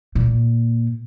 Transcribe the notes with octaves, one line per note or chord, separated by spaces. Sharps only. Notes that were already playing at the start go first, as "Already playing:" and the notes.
A#2